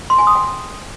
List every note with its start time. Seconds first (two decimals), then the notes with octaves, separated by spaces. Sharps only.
0.10 C6
0.18 G#5
0.27 D#6
0.35 G5